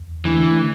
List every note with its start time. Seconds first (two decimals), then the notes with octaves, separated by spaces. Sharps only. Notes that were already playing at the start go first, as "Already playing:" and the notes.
Already playing: E2
0.25 D3 E3 A3 D4